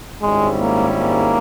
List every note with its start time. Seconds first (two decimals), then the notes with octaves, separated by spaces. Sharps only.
0.22 G#1 G#2 G3 G#3 C#4 E4
0.60 A#3
0.98 A#3